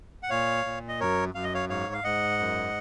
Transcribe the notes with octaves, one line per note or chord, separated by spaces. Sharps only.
F#5
A#2 C#5 F5
A#2
D#5
F#2 A#4 C#5
F#2 F5
D#5
C#5 F5
G#2 C#5 F5
F5
G#2 D#5 F#5
F#2